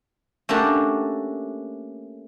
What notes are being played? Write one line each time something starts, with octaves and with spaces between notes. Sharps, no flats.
A3 A#3 C#4 D4 F#4 G4